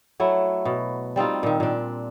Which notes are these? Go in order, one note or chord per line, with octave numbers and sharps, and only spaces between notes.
F#3 A3 E4
B2
G3 C4 D#4 F4
A#2 D#3
A#2 D4